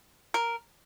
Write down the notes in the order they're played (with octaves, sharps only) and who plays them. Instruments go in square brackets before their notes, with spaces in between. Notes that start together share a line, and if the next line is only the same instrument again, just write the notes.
[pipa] A#4